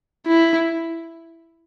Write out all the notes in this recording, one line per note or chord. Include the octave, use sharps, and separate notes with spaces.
E4